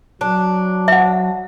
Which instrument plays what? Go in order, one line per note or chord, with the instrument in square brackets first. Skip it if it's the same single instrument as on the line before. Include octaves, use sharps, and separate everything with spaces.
[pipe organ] F#3 [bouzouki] D4
[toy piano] E5 F#5